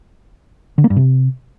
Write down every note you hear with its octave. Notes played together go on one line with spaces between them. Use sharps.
D3
A#3
G2
C3